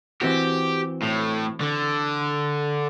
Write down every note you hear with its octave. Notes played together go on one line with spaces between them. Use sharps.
E3 C4 F#4 G4
A2
D3